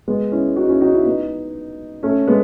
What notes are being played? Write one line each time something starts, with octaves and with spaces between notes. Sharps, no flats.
G#3 B3
C#4 E4
D#4 F#4
C#4 E4
D#4 F#4
C#4 E4
B3 D#4
A3 C#4
G#3 B3